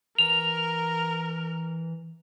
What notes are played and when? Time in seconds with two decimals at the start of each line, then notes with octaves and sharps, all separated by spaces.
0.18 E3 A#4 F7